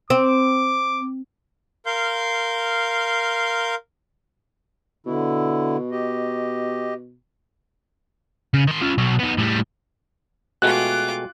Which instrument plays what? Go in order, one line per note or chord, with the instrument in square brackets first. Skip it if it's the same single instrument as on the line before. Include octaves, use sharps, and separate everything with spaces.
[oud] C4 [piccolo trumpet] D6
[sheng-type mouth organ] A#4 F5 C6 G6
[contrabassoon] B2 [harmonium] D3 E4
[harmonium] G4 D#5
[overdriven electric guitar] C#3
D#3 C6
C#4 F4
B2 F#3
B3 D#4
A2 G3
[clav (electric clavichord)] B2 G#3 A3 [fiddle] F4 D6 [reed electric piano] F#4 G5 [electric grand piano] F#6